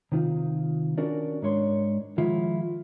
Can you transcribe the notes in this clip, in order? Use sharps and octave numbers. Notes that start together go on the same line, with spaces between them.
C3 D#3 F4
C#4 D4 F#4 A#4 D5
G#2 D4 C#5 C6
D#3 F3 F#3 G#3 E4 F4